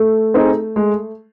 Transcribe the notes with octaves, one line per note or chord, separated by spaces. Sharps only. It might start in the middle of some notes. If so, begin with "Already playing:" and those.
Already playing: A3
C4 D#4 G#4
G#3